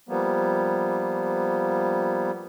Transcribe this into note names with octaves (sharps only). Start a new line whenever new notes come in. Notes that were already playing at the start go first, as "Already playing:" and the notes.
F3 G3 A#3 B3